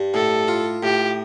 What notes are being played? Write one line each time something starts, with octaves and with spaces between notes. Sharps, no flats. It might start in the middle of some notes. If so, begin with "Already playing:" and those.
Already playing: G2
A2 A4
F4
A2 G4